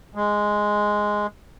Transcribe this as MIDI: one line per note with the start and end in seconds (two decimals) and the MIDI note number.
0.15 1.27 56